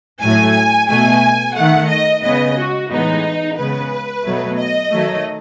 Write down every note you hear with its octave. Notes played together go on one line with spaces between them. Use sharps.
A2 F#3 A3 G#5
B2 A3 G#5
D#3 A3 F#5
D#5
C#3 G#3 B3 D#5
F#4
A2 E3 G#3 B3 D#4
C#3 G#3 B3 B4
B2 F#3 A3
D#5
D#3 F#3 A3